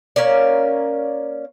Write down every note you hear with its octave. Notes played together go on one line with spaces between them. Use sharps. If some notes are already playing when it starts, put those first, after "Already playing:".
A#3 C#4 A#4 D5